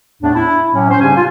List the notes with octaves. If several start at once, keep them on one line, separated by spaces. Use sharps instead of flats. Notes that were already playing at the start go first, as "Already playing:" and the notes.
E2 A2 A3 B3 D4
E4
A2 C3 F#3 C#4
C#4 C5
G#2 C#3 G3 D4 G4 G#5
F4